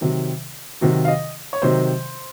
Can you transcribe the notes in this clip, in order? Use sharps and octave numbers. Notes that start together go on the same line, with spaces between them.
C3 D#3 F#3
C3 D#3 F#3 F#4
F5
D#5
C#5
C3 D#3 F#3 C5